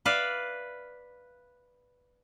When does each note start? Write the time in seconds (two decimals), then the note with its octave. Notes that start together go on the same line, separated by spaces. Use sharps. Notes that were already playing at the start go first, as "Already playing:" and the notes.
0.05 B4 D5 E5 F5